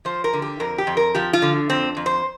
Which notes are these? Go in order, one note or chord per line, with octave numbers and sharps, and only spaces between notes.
F3 C5
A#4
D3
G4
F2 A#4
G4
F2
A#4
F3 G4
F4
D3
F2 C4
F2
C5